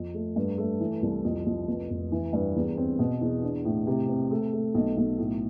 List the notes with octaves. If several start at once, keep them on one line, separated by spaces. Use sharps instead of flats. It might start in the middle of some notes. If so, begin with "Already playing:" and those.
Already playing: F2
A3
G2
A3
E3
C2
F2
F2
F1
F1
E3
G2
E2
C4
B2
E2
D4
A2
C3
C4
A3
A3
B1
B1
A2